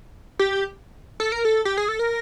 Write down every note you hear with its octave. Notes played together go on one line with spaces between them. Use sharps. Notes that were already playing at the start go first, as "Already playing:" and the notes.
G4
A4
A#4
A4
G4
G#4
A4
A#4